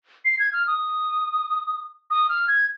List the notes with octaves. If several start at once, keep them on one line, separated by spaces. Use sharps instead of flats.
C7
G#6
F6
D#6
D#6
F6
G#6